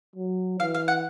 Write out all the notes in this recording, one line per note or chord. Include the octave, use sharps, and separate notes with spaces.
F#3
E3 F5
F5
F#5